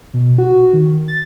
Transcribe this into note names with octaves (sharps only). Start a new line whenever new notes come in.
B2
F#4
D#3
A6